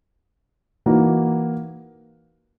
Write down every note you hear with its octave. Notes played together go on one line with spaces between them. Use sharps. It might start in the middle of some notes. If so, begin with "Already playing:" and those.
E3 A#3 D#4 F#4